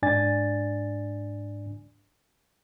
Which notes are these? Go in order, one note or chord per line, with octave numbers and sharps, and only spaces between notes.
G#2 D4 D5 G#5 A6